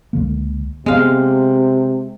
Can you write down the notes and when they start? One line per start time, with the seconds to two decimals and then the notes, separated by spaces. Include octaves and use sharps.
0.13 C#2 D3 A#3
0.86 C3 G#3 B3 F5